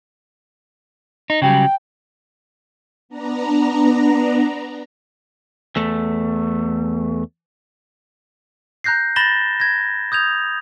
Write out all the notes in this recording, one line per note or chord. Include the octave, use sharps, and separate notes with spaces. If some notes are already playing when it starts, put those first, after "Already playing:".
D#4
C#3 F#3 G3 G5
B3 D4 A#5
E2 A3
A#5 F#6 G6 A#6 C7
B5 A6 A#6 E7 G7
G#6 A#6
D#6 G6 G#6 F7